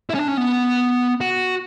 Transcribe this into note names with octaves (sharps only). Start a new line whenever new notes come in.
E4
C#4
D4
C#4
B3
F#4